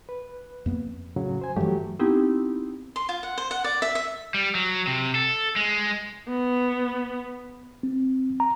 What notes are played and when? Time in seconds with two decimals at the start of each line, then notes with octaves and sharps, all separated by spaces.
0.09 B4
0.66 F2 A#3 B3
1.16 A2 C#3 F#3
1.41 C5 G#5
1.56 G2 E3 F#3 A3 G4
1.99 B3 C4 D#4 E4 G4
2.96 C6
3.09 F4
3.23 F#5
3.38 C5
3.51 F#5
3.64 D5
3.82 E5
3.95 E5
4.34 G3
4.55 F#3
4.87 C3
5.15 A4
5.56 G#3
6.29 B3
7.83 C4
8.40 A#5